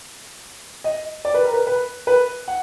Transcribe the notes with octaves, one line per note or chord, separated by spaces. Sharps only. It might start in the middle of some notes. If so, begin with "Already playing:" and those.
D#5
D5
B4
A#4
B4
B4
B4
F#5